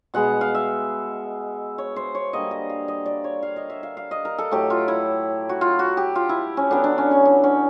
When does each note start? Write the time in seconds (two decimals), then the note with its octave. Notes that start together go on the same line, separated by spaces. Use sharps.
0.14 B2 G#3 B3 F#5
0.41 F5
0.55 E5
1.78 C#5
1.96 C5
2.15 C#5
2.33 D3 G3 A#3 D#5
2.51 D#5
2.70 F5
2.88 D#5
3.06 D5
3.24 C#5
3.43 F5
3.56 D#5
3.70 E5
3.83 F5
3.97 F5
4.11 D#5
4.25 A#4
4.38 A4
4.51 A2 F#3 A3 G4
4.70 F4
4.88 E4
5.49 F#4
5.61 F4
5.79 F#4
5.97 G4
6.16 F4
6.29 E4
6.57 C#4
6.71 D3 F#3 B3 D4
6.84 D4
6.98 C#4
7.11 C#4
7.25 D4
7.44 C#4